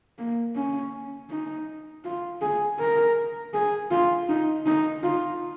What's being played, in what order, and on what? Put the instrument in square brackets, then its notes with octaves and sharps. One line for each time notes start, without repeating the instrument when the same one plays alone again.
[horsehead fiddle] A#3
C#4
D#4
F4
G#4
A#4
G#4
F4
D#4
D#4
F4